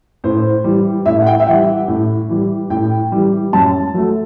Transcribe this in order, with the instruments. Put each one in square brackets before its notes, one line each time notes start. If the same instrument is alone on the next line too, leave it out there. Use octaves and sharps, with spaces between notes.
[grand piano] A2 C5
E3 G3
A2 E5
F#5
G5
E5
E3 G3 F#5
A2
E3 G3
A2 G5
E3 G3
F#2 A5
F#3 A3